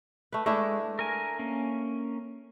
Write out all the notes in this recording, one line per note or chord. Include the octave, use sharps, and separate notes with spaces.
A3 B4
G#3 A3 D4 E4
A#4 G#5
A#3 C#4